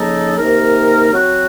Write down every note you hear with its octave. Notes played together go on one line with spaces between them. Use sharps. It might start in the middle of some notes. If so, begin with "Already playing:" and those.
Already playing: C#3 F3 A#3 D#4 A4
C3 D#3 A#3 D#4 A#4
F#3 C4 F#4